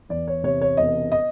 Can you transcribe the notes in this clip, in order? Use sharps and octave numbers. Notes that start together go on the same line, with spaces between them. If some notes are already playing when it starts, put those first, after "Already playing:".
E2 D5
C#5
C3 C#5
C#5
E1 D#5
D#5